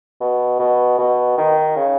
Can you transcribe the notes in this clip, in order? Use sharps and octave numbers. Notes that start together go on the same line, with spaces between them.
B2
B2
B2
D#3
C#3